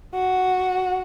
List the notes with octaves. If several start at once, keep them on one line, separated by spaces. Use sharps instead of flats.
F#4